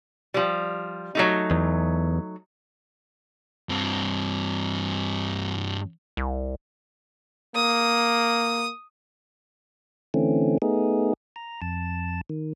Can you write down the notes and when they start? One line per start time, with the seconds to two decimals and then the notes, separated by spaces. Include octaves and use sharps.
0.34 F3 G3
1.15 F#3 A3 D#4
1.51 E2
3.69 G2 C4
6.17 C2
7.55 A#3 D#6
10.14 D3 E3 A3 C4 C#4
10.62 A3 B3 D#4 G#4
11.36 A#5
11.62 F2 A5
12.29 D#3